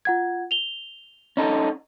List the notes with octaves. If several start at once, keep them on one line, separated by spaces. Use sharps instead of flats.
F4 F#5 G#6
F7 G7
C#4 D#4 A4